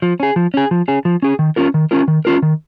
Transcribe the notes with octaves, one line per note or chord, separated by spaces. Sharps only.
F3
C#4 G#4
F3
C#4 G#4
F3
C#4 G#4
F3
C#4 G#4
D#3
C#4 F4 A#4
D#3
C#4 F4 A#4
D#3
C#4 F4 A#4
D#3